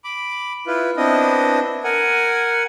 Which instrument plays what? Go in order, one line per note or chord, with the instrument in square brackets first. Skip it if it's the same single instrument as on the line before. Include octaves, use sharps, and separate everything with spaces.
[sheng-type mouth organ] B5 D6
E4 F4 B4
B3 C4 D4 E4 D#5
A#4 F#5 G#5